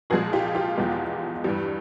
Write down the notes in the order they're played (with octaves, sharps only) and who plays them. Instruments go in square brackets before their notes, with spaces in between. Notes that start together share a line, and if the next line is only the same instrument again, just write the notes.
[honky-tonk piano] C2 A#2 F3 G#3 F#4 G#4
F4 G4
F4 G4
E2 B2 G#3
G2 E3 G3